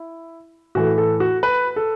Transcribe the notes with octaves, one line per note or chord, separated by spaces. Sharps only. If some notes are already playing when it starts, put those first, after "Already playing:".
Already playing: E4
A2 E3 A3 F#4
A4
F#4
B4
A4